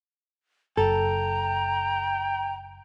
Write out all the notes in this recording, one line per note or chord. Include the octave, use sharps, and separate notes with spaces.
F#1 A4 G5 A#5